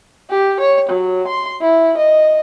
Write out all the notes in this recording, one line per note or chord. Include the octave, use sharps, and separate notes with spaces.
G4
C#5
F#3
C6
E4
D#5